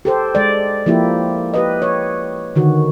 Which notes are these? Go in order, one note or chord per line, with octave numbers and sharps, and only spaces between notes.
G4 A4 C5
G#3 D5
F3 A#3 E4 G4
G4 B4 D#5
C#5
D3 D#3 F#4